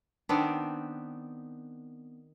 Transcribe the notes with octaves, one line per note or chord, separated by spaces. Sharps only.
D#3 B3 C4 D4